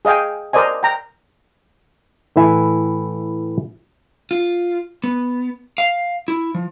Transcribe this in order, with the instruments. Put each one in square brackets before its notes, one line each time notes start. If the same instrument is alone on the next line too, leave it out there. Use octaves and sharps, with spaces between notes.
[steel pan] G#4 D#5 F5 G5 G#5
A#4 C5 D5 D#5 G#5
G5 A#5
[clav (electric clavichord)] A2 E3 E4 G#5
[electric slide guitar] F4
B3
F5
E4
F3